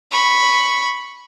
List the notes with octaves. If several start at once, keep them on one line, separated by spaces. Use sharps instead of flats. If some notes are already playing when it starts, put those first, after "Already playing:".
B5 C#6